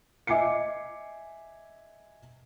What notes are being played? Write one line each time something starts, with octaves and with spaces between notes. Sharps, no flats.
D#5 E5 G#5 D6 C7 C#7